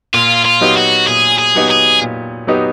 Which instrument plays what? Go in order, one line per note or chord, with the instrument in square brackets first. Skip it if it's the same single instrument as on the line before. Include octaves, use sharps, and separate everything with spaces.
[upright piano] A#2 [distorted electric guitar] F4
[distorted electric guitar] F4
[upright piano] F#3 B3 D#4 G4
[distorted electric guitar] F#4
[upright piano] A#2 [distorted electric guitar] G#4
[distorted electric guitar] G#4
[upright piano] F#3 B3 D#4 G4
[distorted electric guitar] G#4
[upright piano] A#2
F#3 B3 D#4 G4